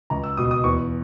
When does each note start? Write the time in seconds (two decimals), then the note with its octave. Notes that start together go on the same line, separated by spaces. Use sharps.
0.10 C#2 A#5
0.24 E6
0.37 B2 D#6
0.51 D#6
0.64 E2 C#6